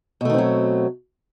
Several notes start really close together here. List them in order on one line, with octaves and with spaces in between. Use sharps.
B2 A3 D#3 C4 F#3